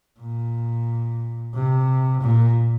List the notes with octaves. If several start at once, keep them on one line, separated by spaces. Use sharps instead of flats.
A#2
C3
A#2